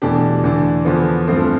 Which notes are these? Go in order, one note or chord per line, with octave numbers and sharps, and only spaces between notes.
E2 B2 A3 D4 G4
E2 D3 A3 D4
E2 D3 F3 B3
G2 F3 A3 C4